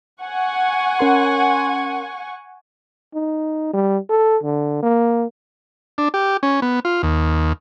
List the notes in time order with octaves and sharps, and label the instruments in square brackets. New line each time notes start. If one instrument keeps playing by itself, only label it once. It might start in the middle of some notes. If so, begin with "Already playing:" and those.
[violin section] F#5 G#5 C#6
[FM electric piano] C#4 A#4 C6
[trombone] D#4
G3
A4
D3
A#3
[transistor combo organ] D4
G4
C#4
B3
F4
D#2